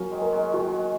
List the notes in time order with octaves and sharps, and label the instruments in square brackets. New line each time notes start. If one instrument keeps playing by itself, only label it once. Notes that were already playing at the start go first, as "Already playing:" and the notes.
Already playing: [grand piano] F#3 F#4 A#4 [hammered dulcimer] A#3 C#4
[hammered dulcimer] D#3 G#3
[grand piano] A#4
[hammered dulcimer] G#3 C#4
[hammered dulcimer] D#3 G#3 [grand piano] F#4